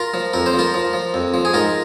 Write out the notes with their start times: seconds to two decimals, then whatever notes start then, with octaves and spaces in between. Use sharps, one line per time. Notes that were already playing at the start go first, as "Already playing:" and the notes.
Already playing: F4 A#4
0.14 F3
0.34 F2 A#4
0.46 C5
0.53 F3
0.59 F4 A#4
0.74 F3
0.93 F3
1.14 F2
1.34 F3
1.45 G#4
1.54 G#2 F4 A#4